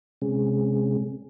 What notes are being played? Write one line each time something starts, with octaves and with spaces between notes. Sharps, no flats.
C3 G#3 C4 C#4 G#4